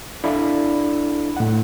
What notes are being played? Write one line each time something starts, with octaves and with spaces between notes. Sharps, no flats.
D4 E4 A4 D5 F5 B5
A2 F#5